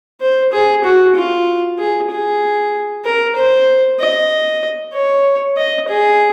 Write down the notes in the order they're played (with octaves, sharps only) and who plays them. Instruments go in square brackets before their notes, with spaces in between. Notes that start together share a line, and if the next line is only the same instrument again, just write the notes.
[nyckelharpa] C5
G#4
F#4
F4
G#4
G#4
A#4
C5
D#5
C#5
D#5
G#4